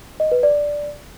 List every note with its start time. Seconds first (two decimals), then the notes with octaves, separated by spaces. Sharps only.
0.20 D#5
0.32 B4
0.43 D5